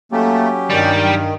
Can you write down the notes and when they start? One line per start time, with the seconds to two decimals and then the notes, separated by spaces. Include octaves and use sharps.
0.12 F#3 A3 A#3 C#4 G4
0.71 G2 D#3 G3